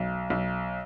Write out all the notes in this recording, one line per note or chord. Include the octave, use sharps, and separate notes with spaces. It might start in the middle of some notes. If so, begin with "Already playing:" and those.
Already playing: B1
B1